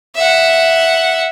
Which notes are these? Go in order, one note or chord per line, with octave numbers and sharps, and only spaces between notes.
E5 F#5